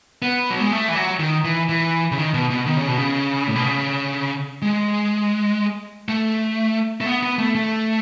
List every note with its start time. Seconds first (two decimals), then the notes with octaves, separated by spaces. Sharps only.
0.22 B3
0.50 F#3
0.61 G#3
0.71 A3
0.88 E3
0.95 F#3
1.20 D#3
1.44 E3
1.69 E3
2.12 C#3
2.18 D#3
2.34 B2
2.50 B2
2.66 D#3
2.77 C#3
2.88 B2
2.98 C#3
3.48 A2
3.55 B2
3.64 C#3
4.62 G#3
6.09 A3
7.01 A3
7.06 B3
7.23 B3
7.38 A3
7.55 A3